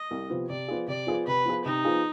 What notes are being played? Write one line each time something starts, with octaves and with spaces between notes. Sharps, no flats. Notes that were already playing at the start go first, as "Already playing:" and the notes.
Already playing: D#5
C2
C3 F3 B3
C3 D5
F3 B3 F4 G#4
C3 D5
F3 B3 F4 G#4
C3 B4
F3 B3 F4 G#4
C3 D#4
F3 B3 F4 G#4